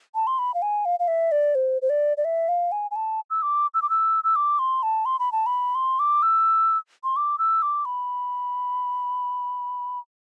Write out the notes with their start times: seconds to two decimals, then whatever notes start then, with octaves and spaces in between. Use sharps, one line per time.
0.15 A5
0.27 C6
0.39 B5
0.54 F5
0.62 G#5
0.85 F5
1.00 F5
1.08 E5
1.32 D5
1.55 C5
1.82 C5
1.90 D5
2.17 D5
2.25 E5
2.49 F5
2.72 G#5
2.91 G#5
2.96 A5
3.30 E6
3.42 D6
3.74 E6
3.82 D6
3.90 E6
4.24 E6
4.36 D6
4.59 C6
4.83 A5
5.06 C6
5.19 B5
5.32 A5
5.46 B5
5.75 C6
5.99 D6
6.23 E6
7.04 C6
7.16 D6
7.39 E6
7.62 D6
7.85 B5